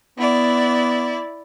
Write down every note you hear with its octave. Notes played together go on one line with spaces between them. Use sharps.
B3 E4 D5